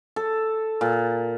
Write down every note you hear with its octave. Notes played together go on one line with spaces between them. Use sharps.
A4
A#2